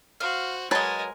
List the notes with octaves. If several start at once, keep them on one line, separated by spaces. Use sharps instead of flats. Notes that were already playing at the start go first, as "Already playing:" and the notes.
F#4 C5 F5
F#3 G#3 A#4 B4 C#5 D#5 A5